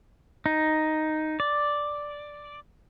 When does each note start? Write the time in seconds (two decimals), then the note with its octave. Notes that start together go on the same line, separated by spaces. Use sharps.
0.46 D#4
1.40 D5